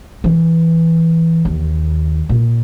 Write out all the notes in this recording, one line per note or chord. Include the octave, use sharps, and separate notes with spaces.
E3
D#2
A#2